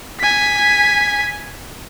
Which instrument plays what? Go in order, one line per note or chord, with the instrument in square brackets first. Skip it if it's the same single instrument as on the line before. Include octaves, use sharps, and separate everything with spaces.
[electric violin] G#5 B6